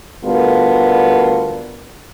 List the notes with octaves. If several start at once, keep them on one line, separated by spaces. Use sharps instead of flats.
D2 G3 B3 F4 A4 A#4